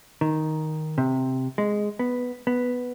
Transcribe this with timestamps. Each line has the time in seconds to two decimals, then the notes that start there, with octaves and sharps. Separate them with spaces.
0.21 D#3
0.98 C3
1.58 G#3
1.99 B3
2.47 B3